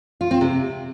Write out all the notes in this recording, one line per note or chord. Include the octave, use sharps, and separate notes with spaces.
F4
C4
C3